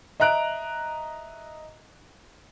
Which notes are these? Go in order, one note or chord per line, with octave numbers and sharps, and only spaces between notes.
D#5 E5 A#5 F#6 D7